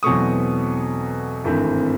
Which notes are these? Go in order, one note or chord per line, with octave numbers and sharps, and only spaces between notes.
E2 B2 F#3 A3 C4 C#6 D#6
G#1 G2 E3 A3 C4